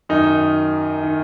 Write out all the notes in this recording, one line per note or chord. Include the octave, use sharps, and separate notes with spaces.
F#2 D#3 D#4
D#3